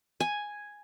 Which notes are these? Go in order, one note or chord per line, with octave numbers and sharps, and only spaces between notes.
G#5